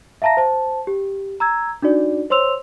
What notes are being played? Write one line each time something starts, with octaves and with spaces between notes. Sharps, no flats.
E5 F5 A5 A#5 A#6
C5 A5
G4
A#5 E6 G#6
D4 D#4 F#4 D5
C5 C#5 C6 E6 F7